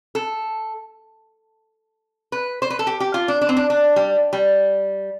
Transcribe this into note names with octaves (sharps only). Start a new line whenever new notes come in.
A4
B4
C5
B4
A4
G4
G4
F4
D4
D4
C4
D4
D4
G3
G3